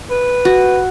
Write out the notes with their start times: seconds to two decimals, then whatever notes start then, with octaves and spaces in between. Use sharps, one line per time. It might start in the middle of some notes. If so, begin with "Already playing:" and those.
0.10 B4
0.45 F#4